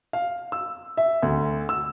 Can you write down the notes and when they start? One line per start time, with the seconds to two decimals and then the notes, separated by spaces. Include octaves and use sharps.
0.13 F5
0.52 E6
0.97 E5
1.23 D2
1.69 E6